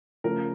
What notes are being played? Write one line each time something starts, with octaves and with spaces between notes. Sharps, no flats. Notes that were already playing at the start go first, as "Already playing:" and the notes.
C#3 F3 A3 A#4